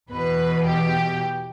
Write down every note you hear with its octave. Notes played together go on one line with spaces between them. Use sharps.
E2 B2 B4
G4